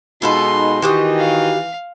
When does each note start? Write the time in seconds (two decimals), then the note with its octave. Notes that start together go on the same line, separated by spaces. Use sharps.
0.22 B2 G#3 D#4 F4 A4 B4 C6
0.82 D#3 E3 F#4 G4 D#5
1.19 F5